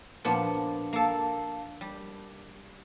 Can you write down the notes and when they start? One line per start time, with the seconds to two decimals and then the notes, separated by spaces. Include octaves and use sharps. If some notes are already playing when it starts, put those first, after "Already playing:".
0.25 A#2 F3 B3 D4
0.93 A#3 A4
1.81 G3